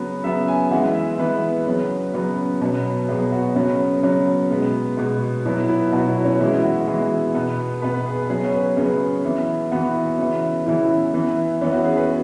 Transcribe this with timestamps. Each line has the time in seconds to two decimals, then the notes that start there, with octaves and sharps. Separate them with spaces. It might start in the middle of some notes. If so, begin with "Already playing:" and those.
Already playing: C#3 F#3 B3
0.24 C#3 F#3 B3 E5
0.48 G#5
0.71 E3 G#3 B3 F#5
0.95 E5
1.18 E3 G#3 B3 B4
1.66 C#3 F#3 B3
2.14 C#3 F#3 B3
2.61 B2 F#3 B3
3.08 B2 F#3 B3 G#4
3.32 F#4
3.55 C#3 F#3 B3 C#4
4.03 C#3 F#3 B3
4.50 B2 G#3 B3
4.97 B2 G#3 B3
5.45 B2 F#3 B3 E4
5.69 E4
5.92 B2 F#3 B3 F#4
6.08 E4
6.25 C#4
6.40 E3 G#3 B3 E4
6.64 F#4
6.87 E3 G#3 B3 G#4
7.35 B2 B3
7.82 B2 B3 B4
7.94 B4
8.06 G#4
8.30 C#3 F#3 B3 G#4
8.45 C#5
8.54 B4
8.77 C#3 F#3 B3 G#4
9.25 E3 B3
9.72 E3 B3 F#4
10.18 C#3 E3 B3
10.66 C#3 E3 B3 E4
11.14 E3 B3
11.61 E3 B3 C#4
11.73 F#4
11.85 G#4
11.97 B4